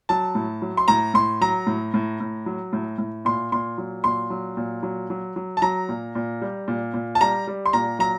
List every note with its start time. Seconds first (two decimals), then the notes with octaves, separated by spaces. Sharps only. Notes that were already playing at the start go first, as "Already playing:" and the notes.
0.09 F#3 A5
0.35 A2
0.62 F#3
0.77 C6
0.88 A2 A#5
1.14 A2 C6
1.41 F#3 A#5
1.67 A2
1.94 A2
2.21 A2
2.46 F#3
2.73 A2
2.98 A2
3.25 A#2 C6
3.52 A#2 C6
3.78 F#3
4.04 A#2 C6
4.30 F#3
4.57 A#2
4.83 F#3
5.10 F#3
5.36 F#3
5.57 A5
5.62 F#3 A#5
5.89 A#2
6.15 A#2
6.42 G3
6.68 A#2
6.94 A#2
7.15 A5
7.21 G3 A#5
7.47 G3
7.66 C6
7.73 A#2 A#5
7.99 F#3 A#5